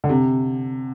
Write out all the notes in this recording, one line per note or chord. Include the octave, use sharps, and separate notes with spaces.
D3
C3